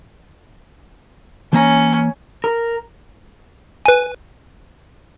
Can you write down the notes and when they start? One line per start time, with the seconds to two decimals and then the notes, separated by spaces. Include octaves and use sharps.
1.53 E3 A#3 C#4 A#5
2.44 A#4
3.86 B4 G#5